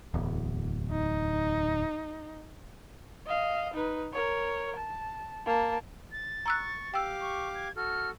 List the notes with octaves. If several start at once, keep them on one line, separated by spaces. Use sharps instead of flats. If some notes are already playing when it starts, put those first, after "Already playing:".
D1 E2
D#4
D#5 F5
D#4 B4
A#4 C#5
A5
A#3 A5
A6
A#5 C#6 E6 F#6
G4 F5 G5 D6 E6
C#6
G#6
F#4 A4 F6